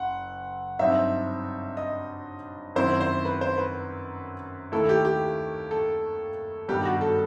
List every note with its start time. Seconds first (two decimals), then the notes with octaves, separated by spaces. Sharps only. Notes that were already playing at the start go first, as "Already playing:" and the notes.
Already playing: F#1 F#5
0.79 G2 F#3 C4 D#4 E5
1.77 D#5
2.76 F#2 D#3 F#3 C4 E4 C5
3.01 C5
3.25 B4
3.41 C5
3.58 B4
4.72 D#2 D#3 A3 E4 A4
4.89 G4
5.05 G4
5.71 A4
6.68 G2 D#3 G3 B3 D#4 G4
6.85 F#4
7.01 A4